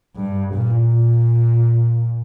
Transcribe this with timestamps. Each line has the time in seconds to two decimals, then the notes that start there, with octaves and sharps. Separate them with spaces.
0.16 G2
0.54 A#2
0.93 A#2